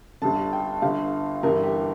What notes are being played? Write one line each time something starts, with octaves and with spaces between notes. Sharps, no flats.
G1 G2 D3 A5
G5
G1 G2 D3 F5
G1 G2 E3 G3 A#4
G4